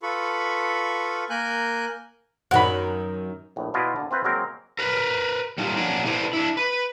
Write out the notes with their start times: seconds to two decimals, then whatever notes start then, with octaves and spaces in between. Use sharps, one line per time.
0.03 F4 A4 B4 B5 C#6
1.30 A#3 A#4 G#5 F#6 G6
2.51 F#2 D#3 F#5 B5
3.56 A#1 A2
3.74 B2 E4 F4 D5 D#5
3.96 A#2 D3
4.11 C4 F4 B4 C5
4.24 F#3 G#3 A#3 C4 A#4
4.79 A#4 B4
5.58 G3 A3 A#3 D#4 F4
5.77 F3 A#3 C#4 D4 F#4 D5
6.05 E4 A4 B4 C5 D5
6.33 D4 E4
6.57 B4